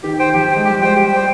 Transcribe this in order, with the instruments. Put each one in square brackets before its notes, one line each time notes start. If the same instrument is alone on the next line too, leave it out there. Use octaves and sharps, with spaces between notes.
[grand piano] D#3 [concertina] G4
[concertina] C5 G5
[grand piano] F3 [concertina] G4
[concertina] C5 G5
[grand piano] G#3
[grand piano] G3 [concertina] G4
[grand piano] G#3 [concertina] C5 G5
[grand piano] G3 [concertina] G4
[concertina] C5 G5